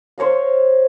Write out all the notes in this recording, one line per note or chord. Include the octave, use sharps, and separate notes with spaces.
C5 C#5 D#5 F5